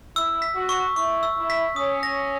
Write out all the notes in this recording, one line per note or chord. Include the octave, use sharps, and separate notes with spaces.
E4 E6
B6
F#4
C#6
E4 C#6
E6
E4
B6
C#4 D#6
A#6